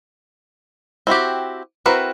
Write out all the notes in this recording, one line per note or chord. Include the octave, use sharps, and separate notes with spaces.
C4 E4 F#4 G4
C4 E4 F#4 A#4 B4